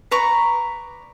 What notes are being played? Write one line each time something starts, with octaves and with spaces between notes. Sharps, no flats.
B4 D5 A#5 C#6